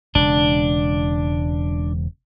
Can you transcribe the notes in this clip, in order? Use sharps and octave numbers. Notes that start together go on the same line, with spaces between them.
E1 C#3 G#3 D4